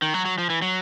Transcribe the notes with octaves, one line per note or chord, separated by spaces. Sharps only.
D#3
F#3
F#3
F3
E3
F#3